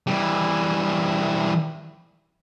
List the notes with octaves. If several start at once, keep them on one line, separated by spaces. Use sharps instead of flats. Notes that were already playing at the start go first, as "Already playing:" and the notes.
E3 G3